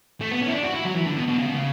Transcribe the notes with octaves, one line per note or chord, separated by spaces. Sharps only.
A3
B3
C#4
E4
D4
F#4
E4
F#3
E3
D3
B2
B2
C#3
B2
C#3